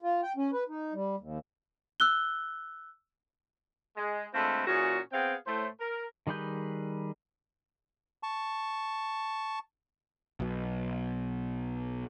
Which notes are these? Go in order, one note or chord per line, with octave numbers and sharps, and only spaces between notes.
F4
G5
C#4
B4
D#4
G3
D#2
E6 F#6 G7
G#3
D3 G#3 A3 C4 F4 B4
A#2 E3 C#4 F#4 G#4
B3 C4 G#4 F5 G5
A2 A3 C5
A#4
D#3 G3 G#4 B4 G6
A5 C#6
B1 B2